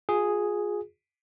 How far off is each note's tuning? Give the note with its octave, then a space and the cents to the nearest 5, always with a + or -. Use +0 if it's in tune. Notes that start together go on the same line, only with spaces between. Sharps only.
F4 +35 G#4 +0